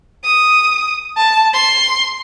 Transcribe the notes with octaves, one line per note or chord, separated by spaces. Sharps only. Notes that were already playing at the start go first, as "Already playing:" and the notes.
D#6
A5
C6